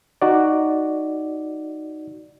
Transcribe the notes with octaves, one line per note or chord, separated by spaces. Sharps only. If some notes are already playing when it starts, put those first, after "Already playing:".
D#4 F#4 D5